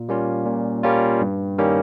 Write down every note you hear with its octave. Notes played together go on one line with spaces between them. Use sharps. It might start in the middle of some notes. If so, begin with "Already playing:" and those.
Already playing: A#2
G3 A#3 C#4 F4
A#2
G3 A#3 C#4 F4
G2
D#3 G3 A#3 C#4